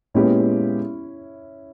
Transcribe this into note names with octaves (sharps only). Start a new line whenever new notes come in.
A#2 G#3 B3 C#4 E4 G4